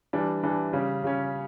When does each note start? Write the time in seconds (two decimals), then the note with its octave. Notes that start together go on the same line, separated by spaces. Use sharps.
0.13 E3 G3 D4
0.43 E3 G3 D4
0.73 C#3 G3 C#4
1.03 C#3 G3 C#4